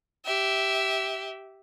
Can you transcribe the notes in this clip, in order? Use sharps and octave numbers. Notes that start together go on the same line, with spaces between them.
G4 E5